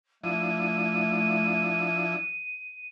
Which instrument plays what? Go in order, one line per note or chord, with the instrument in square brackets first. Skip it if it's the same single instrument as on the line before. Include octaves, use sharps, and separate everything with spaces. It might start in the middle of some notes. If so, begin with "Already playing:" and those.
[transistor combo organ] F3 D4 E4 [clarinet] A3 [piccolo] D#7